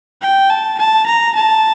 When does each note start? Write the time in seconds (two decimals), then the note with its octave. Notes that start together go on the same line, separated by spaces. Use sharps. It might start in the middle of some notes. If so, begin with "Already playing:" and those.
0.21 G5
0.50 A5
0.78 A5
1.06 A#5
1.35 A5